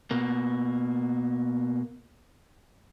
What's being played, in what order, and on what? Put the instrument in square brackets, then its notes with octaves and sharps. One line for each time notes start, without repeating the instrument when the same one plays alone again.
[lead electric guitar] B2 A#3